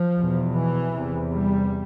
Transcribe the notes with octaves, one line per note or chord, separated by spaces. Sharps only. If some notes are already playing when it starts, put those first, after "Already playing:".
Already playing: F3
E2 B2
E3
E2 C3
G3